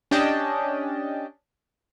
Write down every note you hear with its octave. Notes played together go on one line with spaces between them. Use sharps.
C#4 D4 G4 D#5 G5 A5